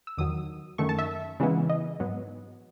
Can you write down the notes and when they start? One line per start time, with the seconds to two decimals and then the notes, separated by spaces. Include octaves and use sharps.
0.07 E6
0.18 E2 D#3 F#3 D#6
0.78 F#2 D#3 A3 C#6
0.89 A5
0.99 E5
1.40 C#3 E3 G#3 B3 E4
1.70 D#5
2.00 G#2 F#3 B3